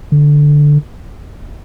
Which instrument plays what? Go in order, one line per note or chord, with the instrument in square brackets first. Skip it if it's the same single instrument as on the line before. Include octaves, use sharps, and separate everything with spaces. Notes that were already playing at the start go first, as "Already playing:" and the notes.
[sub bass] D3